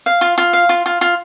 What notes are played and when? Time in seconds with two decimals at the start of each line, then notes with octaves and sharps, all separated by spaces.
0.06 F5
0.21 F4
0.38 F4
0.53 F5
0.69 F4
0.86 F4
1.01 F4